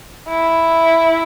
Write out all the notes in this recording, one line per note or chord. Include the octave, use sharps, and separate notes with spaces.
E4